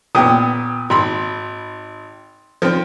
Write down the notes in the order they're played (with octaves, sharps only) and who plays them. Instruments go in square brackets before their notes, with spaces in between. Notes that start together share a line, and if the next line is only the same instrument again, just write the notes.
[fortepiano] A#2 B3 [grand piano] G5 D#6
[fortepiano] G#1 B5 [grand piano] C6
[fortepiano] F3 C4